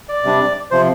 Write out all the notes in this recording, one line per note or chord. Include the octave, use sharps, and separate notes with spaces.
D5
C3 G3 D4
C3 F3 C5